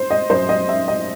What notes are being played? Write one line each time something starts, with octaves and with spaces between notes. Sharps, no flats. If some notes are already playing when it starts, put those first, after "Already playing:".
Already playing: C5
D#5
F#2 F#3 C5
D#5
E5
D#5